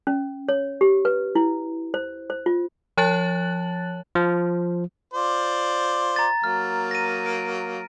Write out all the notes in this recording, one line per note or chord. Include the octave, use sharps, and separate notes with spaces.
C#4
C#5
G4
B4
E4
C5
C5
F4
F3 C#5 A5 F#6 A6 F#7
F3
F4 C5 D5
A#5 A6
F#3 A#3 F6
A#6 D#7
D7